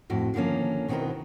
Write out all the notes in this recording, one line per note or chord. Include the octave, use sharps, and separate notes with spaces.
F2 A2 F#4
D3 D#3 F3 A#3 C#4
B2 D#3 B3 C4 E4 A#4